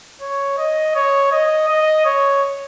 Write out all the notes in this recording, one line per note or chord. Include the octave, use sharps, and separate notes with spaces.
C#5
D#5
C#5
D#5
D#5
C#5